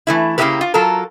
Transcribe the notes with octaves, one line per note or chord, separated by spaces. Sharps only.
E3 A3 E4
C#3 A#3 D#4 E4 G4 B4
F4
F#3 F4 A4 A#4